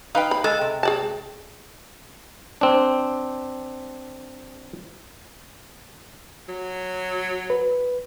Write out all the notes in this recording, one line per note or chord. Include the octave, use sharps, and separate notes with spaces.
D#4 B4 F5 G5
B5
G#3 A4
C3
G#4 D5 A5
C4 D4
F#3
B4